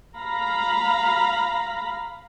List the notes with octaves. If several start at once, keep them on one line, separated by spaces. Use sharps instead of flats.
F5 A#5 B5